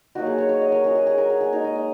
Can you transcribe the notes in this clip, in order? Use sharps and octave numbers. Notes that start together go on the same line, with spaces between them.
F#3 A#3 D#4 F#4
G#4
C#5
C#5
D#5
A#4
F#3 C#4 G#4
G#4
G#4
A#4
G#4
G#4
G#3 D#4 A#4
D#5
D#5